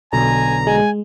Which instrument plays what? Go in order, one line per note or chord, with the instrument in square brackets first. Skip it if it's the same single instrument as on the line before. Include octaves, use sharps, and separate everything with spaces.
[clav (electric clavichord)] B1 B2 D3 [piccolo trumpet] G#5 [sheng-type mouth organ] A#5
[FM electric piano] G#3 [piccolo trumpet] G#5